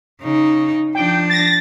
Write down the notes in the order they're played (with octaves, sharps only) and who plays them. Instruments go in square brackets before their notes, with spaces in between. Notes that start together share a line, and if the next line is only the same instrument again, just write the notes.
[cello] C#3 D#4
[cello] F3 D4 [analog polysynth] G5
[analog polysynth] A6 A#6